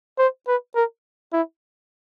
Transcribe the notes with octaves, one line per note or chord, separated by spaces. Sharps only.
C5
B4
A#4
E4